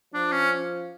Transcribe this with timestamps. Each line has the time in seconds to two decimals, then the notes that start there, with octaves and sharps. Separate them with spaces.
0.14 F3 D4
0.32 C#4